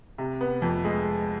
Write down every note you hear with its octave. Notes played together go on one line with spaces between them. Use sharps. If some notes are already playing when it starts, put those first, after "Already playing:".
C3
B3
F2
G#3